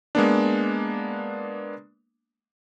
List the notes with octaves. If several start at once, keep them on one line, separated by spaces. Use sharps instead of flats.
G#3 A#3 B3 D4